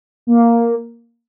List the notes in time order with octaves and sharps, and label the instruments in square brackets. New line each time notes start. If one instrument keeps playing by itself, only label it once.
[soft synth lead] A#3